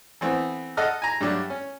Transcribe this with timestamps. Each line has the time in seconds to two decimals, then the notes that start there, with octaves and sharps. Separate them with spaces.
0.21 E3 A3 B3 C4
0.77 A4 D#5 F#5 F6
1.02 G#5 A#5
1.21 G2 F#3 A3 D4
1.50 C#4